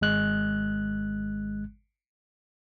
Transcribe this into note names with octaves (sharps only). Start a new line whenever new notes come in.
G#1 G#3 F#6